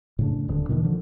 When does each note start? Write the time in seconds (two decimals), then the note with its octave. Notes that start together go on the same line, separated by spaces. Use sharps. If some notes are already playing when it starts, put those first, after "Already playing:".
0.19 A2 C#3 D4
0.48 D#1 D3 D4
0.69 A#2 D#3 E3
0.84 D3 F3